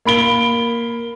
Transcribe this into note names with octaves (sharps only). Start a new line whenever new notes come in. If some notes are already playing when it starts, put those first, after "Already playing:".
A#3 B5 D7 G7